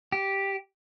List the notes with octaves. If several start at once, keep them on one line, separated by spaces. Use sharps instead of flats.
G4